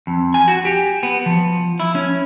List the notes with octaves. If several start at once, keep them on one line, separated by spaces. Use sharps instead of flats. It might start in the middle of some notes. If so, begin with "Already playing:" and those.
F2
G#5
F#4
G4
B3
F3
E4
C#4